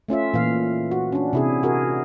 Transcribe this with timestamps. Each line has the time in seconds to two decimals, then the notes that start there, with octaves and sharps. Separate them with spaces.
0.09 A3 C#4 F4 E5
0.34 A#2 E3 F5
0.91 F#4
1.12 C#4 D4
1.33 C3 E4 G#4
1.63 F#4 G#4 A#4